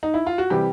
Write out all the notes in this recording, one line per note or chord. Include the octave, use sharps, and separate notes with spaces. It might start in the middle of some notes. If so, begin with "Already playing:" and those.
D#4
E4
F4
F#4
C3 E3 G3 G4